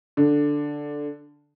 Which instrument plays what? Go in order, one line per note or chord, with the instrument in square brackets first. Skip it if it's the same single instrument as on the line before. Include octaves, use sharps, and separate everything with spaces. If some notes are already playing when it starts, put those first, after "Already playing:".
[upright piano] D3